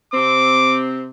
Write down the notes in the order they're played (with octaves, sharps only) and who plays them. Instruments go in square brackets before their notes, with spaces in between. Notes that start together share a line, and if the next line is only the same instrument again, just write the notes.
[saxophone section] C3 C4 [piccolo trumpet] D6